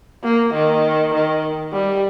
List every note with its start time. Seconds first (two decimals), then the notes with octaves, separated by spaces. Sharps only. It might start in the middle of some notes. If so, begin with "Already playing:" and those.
0.24 A#3
0.54 D#3
1.14 D#3
1.73 G3